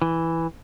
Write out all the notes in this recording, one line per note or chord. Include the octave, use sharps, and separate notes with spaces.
E3